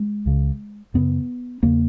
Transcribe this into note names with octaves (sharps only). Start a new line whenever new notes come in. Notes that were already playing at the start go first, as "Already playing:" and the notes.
Already playing: G#3
C#2 C#3
F#2 C#3 B3
E2 C#3 A#3